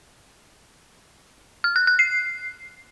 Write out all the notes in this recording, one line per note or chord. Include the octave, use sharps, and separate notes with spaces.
F6
F#6
F#6
C7